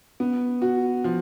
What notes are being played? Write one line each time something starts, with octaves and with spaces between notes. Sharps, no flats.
B3
F#4
F3